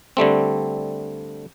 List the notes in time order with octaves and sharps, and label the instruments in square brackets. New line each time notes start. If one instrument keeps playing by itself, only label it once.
[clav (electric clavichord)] D3 G3 A3 C4